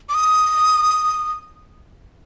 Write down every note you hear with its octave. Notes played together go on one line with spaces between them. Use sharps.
D6
D#6